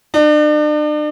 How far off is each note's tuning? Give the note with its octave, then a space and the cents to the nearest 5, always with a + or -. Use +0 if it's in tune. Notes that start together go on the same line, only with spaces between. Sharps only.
D4 +40